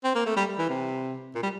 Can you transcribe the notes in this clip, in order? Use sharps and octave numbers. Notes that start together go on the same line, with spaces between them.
C4
A#3
A3
G3
E3
C3
A#2
G3